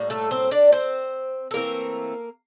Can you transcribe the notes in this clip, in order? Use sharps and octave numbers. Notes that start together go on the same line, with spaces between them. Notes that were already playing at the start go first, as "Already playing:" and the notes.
Already playing: A2 G3 A#3
A3 A4
C4 C5
D4 D5
C4 C5
A4
E3 A3 A#3 C4 A#4